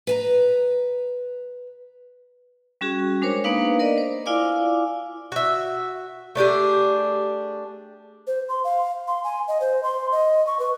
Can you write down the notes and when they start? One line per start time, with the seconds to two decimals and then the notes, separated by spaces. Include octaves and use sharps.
0.07 B4 G#5 A#5
2.81 G3 C#4 F#4 G#4
3.22 G#3 D4 A#4 C5 C#5
3.44 A#3 B3 D4 D#4 B4 F5
3.79 A#4 D5 D#5
3.98 C5
4.26 E4 F4 D5 F5 G#5 D6
5.32 F#4 E5
6.35 A3 D4 G4 G#4
8.27 C5
8.49 C6
8.64 F5
9.08 C6
9.24 G#5
9.48 D#5
9.61 C5
9.83 C6
10.12 D#5
10.47 C#6
10.59 B4